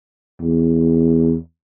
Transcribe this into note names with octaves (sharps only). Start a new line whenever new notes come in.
E2